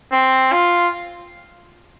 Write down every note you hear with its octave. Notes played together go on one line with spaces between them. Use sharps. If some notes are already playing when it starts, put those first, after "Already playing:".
C4
F4